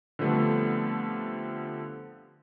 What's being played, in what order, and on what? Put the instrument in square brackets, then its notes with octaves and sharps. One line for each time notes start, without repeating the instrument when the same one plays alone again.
[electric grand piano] D3 F3 G3 A3 B3 C4